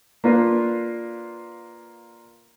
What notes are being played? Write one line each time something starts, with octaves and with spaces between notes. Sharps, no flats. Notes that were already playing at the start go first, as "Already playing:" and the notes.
A#3 D4 F4 B4